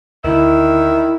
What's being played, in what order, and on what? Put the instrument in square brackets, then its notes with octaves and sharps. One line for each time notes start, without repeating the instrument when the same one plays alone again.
[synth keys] D2 D3 [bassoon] D#3 [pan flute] E4 [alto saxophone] E5